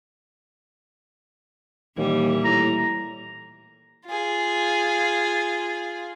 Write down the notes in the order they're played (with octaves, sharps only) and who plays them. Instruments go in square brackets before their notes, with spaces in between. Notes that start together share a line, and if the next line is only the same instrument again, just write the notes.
[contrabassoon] D#2 [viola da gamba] A#2 E3 G3
[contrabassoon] A2 [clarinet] A#5
[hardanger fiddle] F4 G#4